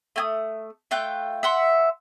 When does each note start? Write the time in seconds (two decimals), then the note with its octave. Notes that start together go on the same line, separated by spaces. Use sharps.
0.16 A3 G#5 D#6
0.91 A3 F4 G5 F#6
1.43 E5 F#5 C6